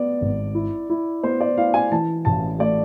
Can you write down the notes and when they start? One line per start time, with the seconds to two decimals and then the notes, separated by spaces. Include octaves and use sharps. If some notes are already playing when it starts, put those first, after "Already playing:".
Already playing: B3 D5
0.21 G#1
0.55 E4
0.90 E4
1.23 B3 C5
1.41 D5
1.57 E4 F5
1.74 G#5
1.92 E3 A5
2.25 A1 A5
2.59 A3 D5